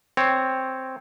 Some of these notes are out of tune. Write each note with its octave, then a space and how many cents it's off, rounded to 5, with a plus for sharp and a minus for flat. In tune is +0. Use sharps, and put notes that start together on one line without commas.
C4 +0 C#5 +0